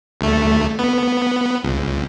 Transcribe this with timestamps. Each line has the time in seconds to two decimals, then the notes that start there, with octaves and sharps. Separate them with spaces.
0.21 D2 A3
0.79 B3
1.64 C#2